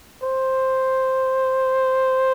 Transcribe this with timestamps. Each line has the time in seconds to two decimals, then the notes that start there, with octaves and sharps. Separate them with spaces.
0.23 C5